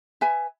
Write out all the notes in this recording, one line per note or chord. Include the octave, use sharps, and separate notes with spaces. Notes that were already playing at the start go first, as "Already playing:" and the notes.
B4 E5 G#5